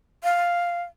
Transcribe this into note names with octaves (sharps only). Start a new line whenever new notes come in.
F5